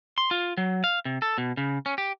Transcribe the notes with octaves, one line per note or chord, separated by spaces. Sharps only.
C6
F4
F#3
F5
C3
A4
B2
C#3
C#4
G4